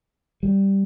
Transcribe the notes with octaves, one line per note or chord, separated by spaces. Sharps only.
G3